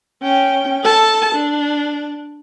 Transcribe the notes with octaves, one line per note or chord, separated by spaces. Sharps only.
C#4 G5
A4 A5
D4